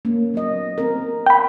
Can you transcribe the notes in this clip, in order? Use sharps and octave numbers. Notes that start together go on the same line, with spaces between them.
A#3 C#4
F#3 B3 D#5
C4 A#4
G5 B5